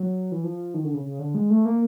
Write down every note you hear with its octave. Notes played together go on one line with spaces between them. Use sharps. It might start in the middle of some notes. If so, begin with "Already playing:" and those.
Already playing: F#3
E3
F3
D#3
D3
C#3
C#3
D3
G#3
A3
A#3